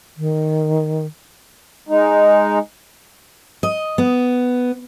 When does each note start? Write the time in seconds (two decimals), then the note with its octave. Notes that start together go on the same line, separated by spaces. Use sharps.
0.17 D#3
1.89 G#3 D#4
3.63 D#5
3.98 B3